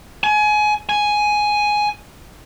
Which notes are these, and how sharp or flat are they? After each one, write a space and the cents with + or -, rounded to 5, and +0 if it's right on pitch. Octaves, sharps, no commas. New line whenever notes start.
G#5 +25
G#5 +5